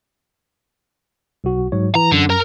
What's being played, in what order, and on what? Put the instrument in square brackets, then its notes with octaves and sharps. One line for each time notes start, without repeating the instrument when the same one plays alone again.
[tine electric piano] B1 F#4
G#2 F#3 C#5
[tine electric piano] E3 [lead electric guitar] A#5
[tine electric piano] F#2 [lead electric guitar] D3
[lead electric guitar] A#4 A#5